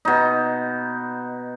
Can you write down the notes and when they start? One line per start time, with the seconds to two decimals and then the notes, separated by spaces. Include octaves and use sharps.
0.05 B2 D#4